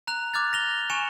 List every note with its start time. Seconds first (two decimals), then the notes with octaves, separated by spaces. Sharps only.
0.07 A#5 F#6 F7
0.34 D6 F6 F#6 G#6 A6
0.53 A#6 F7 G7
0.90 G#5 C#6 C#7 E7